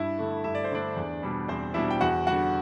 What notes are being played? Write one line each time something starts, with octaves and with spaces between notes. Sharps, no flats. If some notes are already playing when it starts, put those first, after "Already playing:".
Already playing: G2 E4 E5
D3 A3
G2 E5
D5
C5
D3 A3 D4 D5
E2
B2 G3 D4
E2 C4 C5
B2 G3 D4 E4 E5
G5
E2 F#4 F#5
D3 G3 F#4 F#5